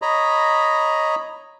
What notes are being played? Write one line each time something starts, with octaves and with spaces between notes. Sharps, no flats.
C#5 D#5 A#5 B5